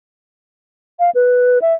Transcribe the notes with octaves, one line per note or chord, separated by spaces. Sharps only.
F5
B4
E5